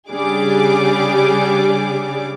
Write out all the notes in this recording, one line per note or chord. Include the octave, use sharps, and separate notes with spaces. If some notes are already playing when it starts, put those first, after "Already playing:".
C#3 G3 D4 G#4 D6